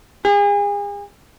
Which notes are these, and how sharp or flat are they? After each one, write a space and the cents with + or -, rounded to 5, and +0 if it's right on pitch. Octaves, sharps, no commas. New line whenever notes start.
G#4 -35